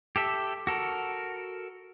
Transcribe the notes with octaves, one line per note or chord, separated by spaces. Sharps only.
G4 A4 E5
F#4 A4 A#4